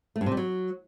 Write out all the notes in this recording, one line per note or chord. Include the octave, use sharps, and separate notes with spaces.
A3
G2
C3
G3
F#3